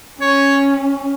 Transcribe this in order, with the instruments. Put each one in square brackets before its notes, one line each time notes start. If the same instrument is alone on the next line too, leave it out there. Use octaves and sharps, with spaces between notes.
[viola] C#4 [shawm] C#5